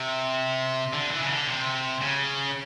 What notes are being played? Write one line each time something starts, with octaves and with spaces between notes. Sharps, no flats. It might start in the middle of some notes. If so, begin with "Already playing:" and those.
Already playing: C3
D3
E3
C#3
D3
C3
C#3